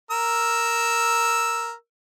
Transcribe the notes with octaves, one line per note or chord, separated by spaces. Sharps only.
A#4 E6